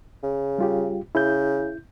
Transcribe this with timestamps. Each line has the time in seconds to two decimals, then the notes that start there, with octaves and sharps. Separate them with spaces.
0.23 C#3
0.58 G3 F4 G4
1.15 C#3 E4 G6